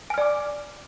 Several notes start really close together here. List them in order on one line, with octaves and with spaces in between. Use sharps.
G#5 F6 D5 D6